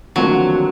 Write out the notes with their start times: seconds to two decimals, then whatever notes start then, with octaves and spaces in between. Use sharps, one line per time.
0.16 D#2 D3 F3 F#3 A3 C4